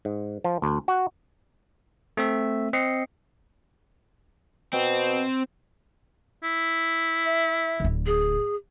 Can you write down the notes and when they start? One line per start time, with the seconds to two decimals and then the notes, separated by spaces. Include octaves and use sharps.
0.05 G#2
0.44 F3
0.62 D2
0.88 F#4
2.17 A3 C4 E5
2.73 C4 D#5 C7 C#7
4.73 B2 C4
6.44 E4
7.25 E5
7.80 D1 D3
8.06 G#4